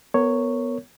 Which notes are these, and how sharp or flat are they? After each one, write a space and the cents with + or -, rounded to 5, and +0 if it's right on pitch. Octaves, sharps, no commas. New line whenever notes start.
B3 +0 A#4 -25 C#5 +0